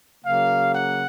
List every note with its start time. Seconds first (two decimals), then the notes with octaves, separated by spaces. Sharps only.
0.24 C#3 F#3 A#3 F5
0.74 F#5